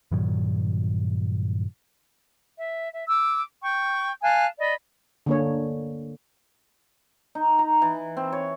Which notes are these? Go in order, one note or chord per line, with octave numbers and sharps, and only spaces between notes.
G2 A#2 D#3 F#3
E5
E5
D6 E6
G5 C#6
F5 G#5 A5 F#6
D5 D#5 B5
D3 A#3 C#5
D#4
A#5
E3
C4
C#5